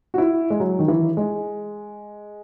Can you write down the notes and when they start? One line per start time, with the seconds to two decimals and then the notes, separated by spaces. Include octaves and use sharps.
0.14 F#4
0.18 E4
0.50 G#3
0.60 F#3
0.79 D#3
0.88 E3
1.17 G#3